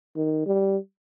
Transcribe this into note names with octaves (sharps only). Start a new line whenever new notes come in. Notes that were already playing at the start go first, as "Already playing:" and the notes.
D#3
G3